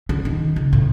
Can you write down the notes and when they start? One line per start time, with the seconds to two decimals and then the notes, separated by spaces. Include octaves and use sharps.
0.09 D3
0.25 D#3
0.56 C#3
0.73 A2